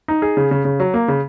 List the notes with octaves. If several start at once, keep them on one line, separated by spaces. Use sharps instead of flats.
D#4
G#4
C#3
C#3
C#3
F#3
A#3
C#3